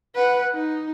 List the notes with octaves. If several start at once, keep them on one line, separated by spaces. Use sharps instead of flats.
B4 F#5
D#4